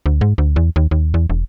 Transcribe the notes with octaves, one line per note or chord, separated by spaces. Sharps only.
D2
G#2
D2
E2
D#2
D#2
E2
E1